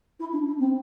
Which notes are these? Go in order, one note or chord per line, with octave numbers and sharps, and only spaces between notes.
E4
D4
D4
C4